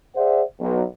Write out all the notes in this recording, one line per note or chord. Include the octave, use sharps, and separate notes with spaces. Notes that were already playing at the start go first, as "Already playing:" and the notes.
G#4 C5 D5 E5 F#5
B1